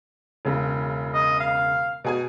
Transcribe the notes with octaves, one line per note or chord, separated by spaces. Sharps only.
E1 C#3
D#5
F5
B2 G#4 G#5